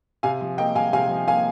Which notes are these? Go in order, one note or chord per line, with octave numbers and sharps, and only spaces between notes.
C3 F5 G#5
F3
A#3 D#5 G5
C3 F5 G#5
C3 F5 G#5
F3
A#3 F5 G#5